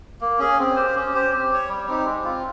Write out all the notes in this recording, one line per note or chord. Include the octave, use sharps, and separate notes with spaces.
A#3
C#4 G#4
C4
G4 C5
C#4
G4 C5
C4
G4 C#5
G3
C4 D#4 G4
G#3
C4 F4